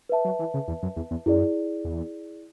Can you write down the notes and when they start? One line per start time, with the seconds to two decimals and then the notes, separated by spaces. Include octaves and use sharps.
0.09 B4 E5 A5
0.25 F#3
0.39 E3
0.54 C#3
0.68 E2
0.83 F#2
0.96 E2
1.11 E2
1.26 F#2 E4 G#4 D5
1.85 E2